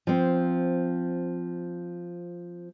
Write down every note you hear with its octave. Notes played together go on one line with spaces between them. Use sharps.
F3 C4